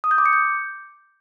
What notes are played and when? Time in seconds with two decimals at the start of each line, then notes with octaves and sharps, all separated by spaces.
0.04 D#6
0.11 G6
0.18 D6
0.26 C#7
0.33 G6